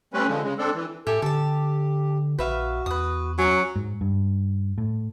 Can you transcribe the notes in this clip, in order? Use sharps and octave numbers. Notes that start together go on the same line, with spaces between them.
G3 A3 C4 C#4 B4
D3 F3 G#3
C#3 G#3
C4 D4 A4
E3
A2 G4 A4 E5 G#5
D3 G4 A4 A5
A#1 F#4 B4 E5 F5
E2 B4 D#6
F#3 C#4 G#5 A#5
G#2
G2
A2